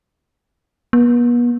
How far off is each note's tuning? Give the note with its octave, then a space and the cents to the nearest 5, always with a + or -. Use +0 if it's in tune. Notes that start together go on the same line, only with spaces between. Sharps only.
B3 -40